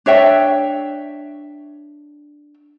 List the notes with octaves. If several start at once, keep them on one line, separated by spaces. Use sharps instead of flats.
D4 C#5 E5 G5